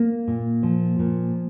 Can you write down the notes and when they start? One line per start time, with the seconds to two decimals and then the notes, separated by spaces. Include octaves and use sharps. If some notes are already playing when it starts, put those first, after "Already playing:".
Already playing: A#3
0.28 A#2
0.63 F3
0.99 A#2